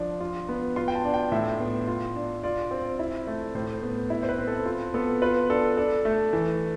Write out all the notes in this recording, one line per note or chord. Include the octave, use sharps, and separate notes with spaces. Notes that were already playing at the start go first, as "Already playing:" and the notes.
Already playing: F3 D4
F4
B3
F4 C6
G5
A5
D4
G5
A2 E5
B3
F4
D4
F4 D5
C4
E4
A3
A2 C5
B3
E4
C5
B4
C4
A4
F4
B3 A4
F4 B4
D4 A4
D4 A4
A3
E3